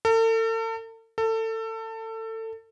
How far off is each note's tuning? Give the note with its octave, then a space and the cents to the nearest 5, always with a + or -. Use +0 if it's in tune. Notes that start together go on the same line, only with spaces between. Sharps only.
A4 +40
A4 +25